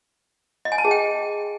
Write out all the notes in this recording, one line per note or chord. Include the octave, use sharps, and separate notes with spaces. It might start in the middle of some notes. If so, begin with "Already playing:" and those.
D#5
G#5
A5
G#4
G5